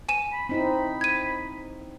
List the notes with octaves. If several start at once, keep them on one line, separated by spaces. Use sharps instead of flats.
G#5 D#7 E7
B5
C4 D#4 E4 B5
G#6 D#7